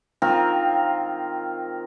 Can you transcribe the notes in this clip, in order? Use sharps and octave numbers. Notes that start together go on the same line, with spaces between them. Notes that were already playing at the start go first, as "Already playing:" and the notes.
D#3 C4 F4 A#4